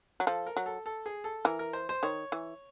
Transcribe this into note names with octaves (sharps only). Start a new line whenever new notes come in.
F#3
F3 A4
A#4
F#3
A4
A4
G#4
A4
E3 A#4
A#4
C5
C5
D#3 C#5
E3